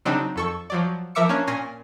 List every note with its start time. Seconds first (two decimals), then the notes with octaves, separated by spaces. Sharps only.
0.05 C#3 F#3 C4 D4 D#4
0.36 F2 A4 C#6
0.70 F3 F#3 D5
1.15 F3 A#4 E5 D6 E6 C#7
1.29 A#3 C#4 D4 C#5
1.47 A#2 C#4 G#5 A#6 C7